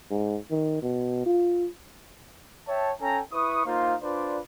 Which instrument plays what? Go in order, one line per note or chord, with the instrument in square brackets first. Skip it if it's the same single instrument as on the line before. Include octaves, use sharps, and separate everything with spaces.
[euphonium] G#2
D#3
B2
F4
[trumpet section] C#5 E5 G5 A5
C#4 A4 G5 G#5 A#5
E4 B4 C#6 D#6
A#3 D#4 F4 C5 F5
D4 F4 B4 C5 D5